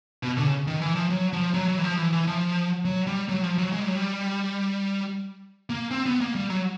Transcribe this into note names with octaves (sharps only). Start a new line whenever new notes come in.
B2
D3
C#3
D#3
E3
F3
F#3
F3
F#3
F#3
E3
F3
E3
E3
F3
F#3
G3
F#3
F3
F#3
G#3
G3
F#3
G3
A#3
C4
B3
A#3
G3
F#3